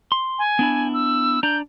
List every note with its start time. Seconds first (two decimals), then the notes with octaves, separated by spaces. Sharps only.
0.12 C6
0.39 G#5
0.59 B3 D4 E4
0.94 E6
1.43 D4 D5 A#5 G6